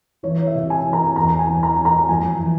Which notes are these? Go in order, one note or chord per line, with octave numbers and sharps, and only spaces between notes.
E3 C#5
E5
C3
G#5
E3
A#5
E2 A#5
G#5
E3
A#5
E3
A#5
F2 G#5
E3